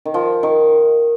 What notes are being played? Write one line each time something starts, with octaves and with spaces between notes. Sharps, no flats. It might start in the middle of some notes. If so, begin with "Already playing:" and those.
D#3
F3
D#3